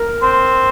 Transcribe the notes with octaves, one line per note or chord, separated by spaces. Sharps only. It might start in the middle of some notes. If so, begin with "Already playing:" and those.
Already playing: A#4
C4